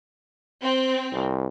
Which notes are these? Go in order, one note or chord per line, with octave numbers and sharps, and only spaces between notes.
C4
C2